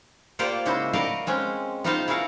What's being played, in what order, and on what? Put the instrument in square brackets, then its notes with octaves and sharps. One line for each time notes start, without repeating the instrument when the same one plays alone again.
[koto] A#3 F4 G4 C5 D5 F#5
C#3 G#3 E4 F#4 C5
F#4 A#4 B4 D5 D#5 F5
G#3 C4 C#4
B3 D#4 F4 C5 D#5 F5
E4 F#4 G#4 A#4 F5 F#5